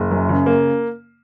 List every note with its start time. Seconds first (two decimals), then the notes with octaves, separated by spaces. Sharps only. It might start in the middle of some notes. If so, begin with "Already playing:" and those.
Already playing: F#1
0.11 F#2
0.29 C#3
0.46 A#3